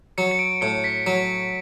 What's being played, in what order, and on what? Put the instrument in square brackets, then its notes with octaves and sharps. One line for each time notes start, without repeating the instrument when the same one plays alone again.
[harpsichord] F#3 [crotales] C#7
[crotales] C#7
D7
[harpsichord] A2 [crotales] C#7
[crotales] B6
[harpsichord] F#3